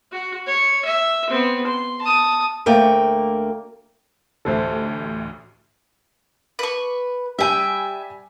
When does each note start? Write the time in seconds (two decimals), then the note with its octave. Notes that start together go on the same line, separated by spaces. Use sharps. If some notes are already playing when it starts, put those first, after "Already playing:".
0.12 F#4
0.47 C#5
0.85 E5
1.30 B3 C4
1.67 C6
2.02 A5 D#6
2.66 D2 A3 A#3 G5
4.45 A1 D2 D3 A4 C5 E5
6.59 B4 C#6
7.39 G3 E5 G5 G#5 D#7